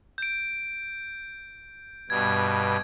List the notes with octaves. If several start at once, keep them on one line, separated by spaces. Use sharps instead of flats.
G6 D7
G2 B2 G#6